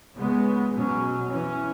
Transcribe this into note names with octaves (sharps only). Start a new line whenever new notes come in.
C#3 G#3 B3
B2 F#3 C#4
E3 C#4